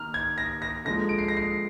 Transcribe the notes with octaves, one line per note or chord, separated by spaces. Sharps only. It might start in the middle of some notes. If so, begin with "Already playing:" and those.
Already playing: D#3 A#3 A#5 F6
G#6
A#6
A#6
D3 F3 G#3 A#6
D7
C7
A#6
C7